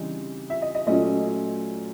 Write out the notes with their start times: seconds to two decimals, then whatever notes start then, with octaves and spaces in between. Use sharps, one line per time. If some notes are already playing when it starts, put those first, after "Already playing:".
Already playing: C#3 E3 G3 C4 D#4
0.50 E5
0.62 D#5
0.75 D#5
0.87 A#2 F#3 A3 C#4 D#5